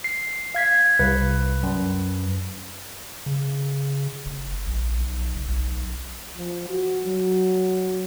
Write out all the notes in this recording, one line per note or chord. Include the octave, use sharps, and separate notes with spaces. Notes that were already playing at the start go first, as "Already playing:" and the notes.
C7
F5 G#6 B6
C2 B4
F#2
C#3
F#1
A#1
B1
F#1
B1
F3
F#4
F#3